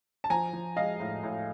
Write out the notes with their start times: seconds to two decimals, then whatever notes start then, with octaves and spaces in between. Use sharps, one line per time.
0.24 A5
0.30 F3 G#5 A#5
0.53 F3
0.76 G#3 D#5 F5
1.00 A2
1.23 A2